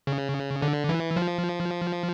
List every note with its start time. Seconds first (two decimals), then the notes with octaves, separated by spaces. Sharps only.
0.07 C#3
0.62 D3
0.89 E3
1.17 F3